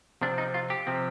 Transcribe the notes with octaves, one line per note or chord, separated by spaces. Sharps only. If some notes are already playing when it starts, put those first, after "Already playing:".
C3 F3 C4 D4
D#4
F4
G4
C3 F3 C4